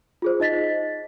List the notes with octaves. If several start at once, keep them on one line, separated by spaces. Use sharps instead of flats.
F4 G#4 C5
D#4 D#5 A6 B6